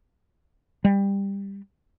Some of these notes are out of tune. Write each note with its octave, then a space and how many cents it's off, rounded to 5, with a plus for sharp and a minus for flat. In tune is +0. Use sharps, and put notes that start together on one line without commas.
G3 +15